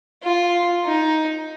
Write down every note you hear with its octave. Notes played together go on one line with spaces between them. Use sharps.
F4
D#4